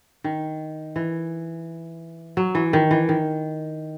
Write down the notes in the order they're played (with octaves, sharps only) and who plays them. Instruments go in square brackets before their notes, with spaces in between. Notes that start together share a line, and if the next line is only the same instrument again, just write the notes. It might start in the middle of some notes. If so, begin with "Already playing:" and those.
[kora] D#3
E3
F#3
E3
D#3
E3
D#3